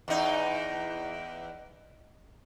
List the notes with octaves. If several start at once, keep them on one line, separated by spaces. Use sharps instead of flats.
E2 D#4